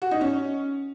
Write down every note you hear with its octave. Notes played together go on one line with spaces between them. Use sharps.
F#4
D#4
C#4